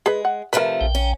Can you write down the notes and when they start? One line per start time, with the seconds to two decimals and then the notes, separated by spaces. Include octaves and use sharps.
0.06 G#3 G#4 B4
0.25 F#5
0.53 C3 F3 A3 A#4 B4
0.81 A#1 G5
0.95 C#4